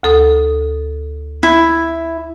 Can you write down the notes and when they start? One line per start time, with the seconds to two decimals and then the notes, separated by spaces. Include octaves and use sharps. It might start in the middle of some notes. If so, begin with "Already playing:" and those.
0.03 D2 A4 D#6
1.43 E4